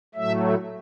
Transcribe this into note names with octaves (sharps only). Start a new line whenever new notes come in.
A2 F#3 A3 E5